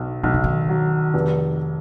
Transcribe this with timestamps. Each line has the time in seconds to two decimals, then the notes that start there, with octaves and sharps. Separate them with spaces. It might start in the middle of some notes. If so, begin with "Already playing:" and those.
Already playing: B1
0.23 B1 D#3
0.34 C#3
0.44 D#3
0.69 F#3
1.14 F1